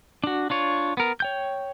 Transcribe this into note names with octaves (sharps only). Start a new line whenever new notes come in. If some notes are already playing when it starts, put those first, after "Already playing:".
D4 F#4
D4 F4 C#5
B3 A#4
C#5 G5 G6